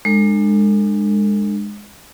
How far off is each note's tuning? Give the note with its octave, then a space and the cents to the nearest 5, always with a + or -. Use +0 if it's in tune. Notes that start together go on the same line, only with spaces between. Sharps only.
G#3 -10 D4 +40 A4 +35